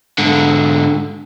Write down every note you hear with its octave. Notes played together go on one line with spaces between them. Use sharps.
G#2 D3